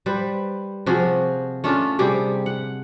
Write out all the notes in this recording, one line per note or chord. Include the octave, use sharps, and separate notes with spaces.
G3 B4 C5
C3 F3 F#4 G#4
A3 C#4 D4 F4
C3 G3 G4 G#4
F#5